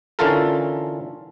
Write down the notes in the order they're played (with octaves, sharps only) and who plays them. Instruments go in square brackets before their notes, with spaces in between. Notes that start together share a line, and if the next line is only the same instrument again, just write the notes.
[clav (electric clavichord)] D3 E3 C#4 F4 A4 A#4